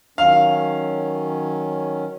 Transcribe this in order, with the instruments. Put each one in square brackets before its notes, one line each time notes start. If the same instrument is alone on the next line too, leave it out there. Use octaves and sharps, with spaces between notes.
[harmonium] D#3 F#3 C#4 [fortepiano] F5